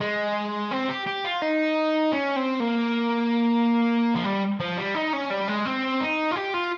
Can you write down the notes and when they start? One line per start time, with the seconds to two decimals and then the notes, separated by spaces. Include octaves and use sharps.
0.01 G#3
0.71 C4
0.89 G4
1.07 G4
1.25 F4
1.42 D#4
2.12 C#4
2.36 C4
2.60 A#3
4.16 F3
4.24 G3
4.60 F3
4.77 G3
4.94 D#4
5.13 C#4
5.30 G3
5.48 G#3
5.66 C4
6.01 D#4
6.32 F4
6.36 G4
6.54 F4